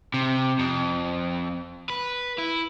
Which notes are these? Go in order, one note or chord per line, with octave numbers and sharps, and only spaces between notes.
C3
F2
B4
E4